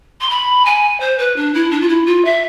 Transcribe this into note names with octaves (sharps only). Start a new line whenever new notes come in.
C6
B5
G#5
C5
B4
D4
E4
D4
F4
E4
F4
E5